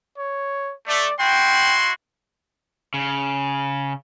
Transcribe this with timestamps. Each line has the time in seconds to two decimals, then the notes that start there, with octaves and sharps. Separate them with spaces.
0.17 C#5
0.88 A3 D5
1.19 E4 F#4 G5 C6
2.94 C#3